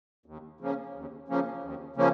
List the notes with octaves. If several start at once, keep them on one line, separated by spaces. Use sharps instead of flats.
D#2
C#3 F3 A#3 C#4
D#2
C#3 F3 A#3 C#4
D#2
C#3 F3 A#3 C#4